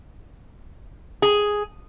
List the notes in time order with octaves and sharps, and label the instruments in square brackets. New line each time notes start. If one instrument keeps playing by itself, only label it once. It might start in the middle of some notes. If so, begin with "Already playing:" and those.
[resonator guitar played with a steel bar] G#4